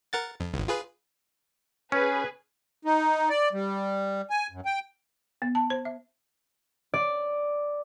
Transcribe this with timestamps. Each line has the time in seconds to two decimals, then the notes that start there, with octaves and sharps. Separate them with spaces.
0.13 A#4 F#5 A6
0.40 F2
0.54 G#1 C#2
0.68 F4 G#4 B4
1.92 C#4 G#4 B4
2.85 D#4
3.30 D5
3.53 G3
4.30 G#5
4.52 F#2
4.65 G5
5.42 B3
5.55 A5
5.70 C5
5.85 E5
6.94 D5